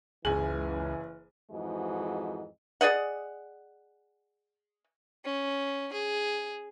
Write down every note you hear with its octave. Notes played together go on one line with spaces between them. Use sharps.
F#1 C#2 E3 G#4 G#5
F2 G#2 E3 G#3 F#4 D#5
G#4 D5 D#5 F#5
C#4
G#4